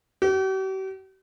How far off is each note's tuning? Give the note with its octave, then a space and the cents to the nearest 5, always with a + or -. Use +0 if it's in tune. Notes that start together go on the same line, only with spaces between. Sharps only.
G4 -45